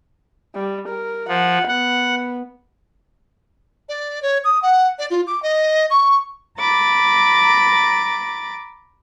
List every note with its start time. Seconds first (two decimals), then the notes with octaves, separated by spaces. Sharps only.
0.55 G3
0.88 A#4
1.28 F3 F#5
1.68 B3 F#5
3.89 D5
4.22 C#5
4.44 D#6
4.62 F#5
4.99 D5
5.10 F4
5.27 D6
5.43 D#5
5.90 C#6
6.59 A#5 B5 D6 A6